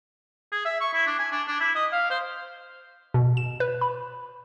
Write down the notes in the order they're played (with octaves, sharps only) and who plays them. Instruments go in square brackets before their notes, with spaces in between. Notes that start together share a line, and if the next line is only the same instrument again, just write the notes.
[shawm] G#4
E5
C#6
E4
D4
G#5
D4
D4
E4
D#5
F5
C5
[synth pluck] B2
E7
B4
B5